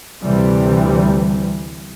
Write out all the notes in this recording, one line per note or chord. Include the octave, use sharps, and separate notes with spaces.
D2 C3 E3 G3